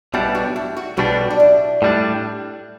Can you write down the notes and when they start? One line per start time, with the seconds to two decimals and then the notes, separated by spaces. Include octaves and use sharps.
0.14 B1 B2 G3 D4 E4
0.35 F#4
0.56 E4
0.77 F#4
0.97 B1 B2 G3 D4 F#4
1.31 D4
1.40 E4
1.82 A2 G3 D4